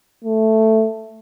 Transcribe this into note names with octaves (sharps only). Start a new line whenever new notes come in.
A3